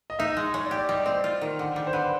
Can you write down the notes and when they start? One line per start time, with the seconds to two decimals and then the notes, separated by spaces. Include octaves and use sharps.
0.10 D#5
0.19 D#4 E5
0.30 D#5
0.37 G#3
0.54 G#3 C#5
0.65 D5
0.71 G4
0.77 D5
0.88 G3 D#5
1.00 D5
1.06 C4
1.12 C5
1.24 F4
1.41 D#3
1.59 D3
1.76 G3
1.87 C5
1.93 D3 B4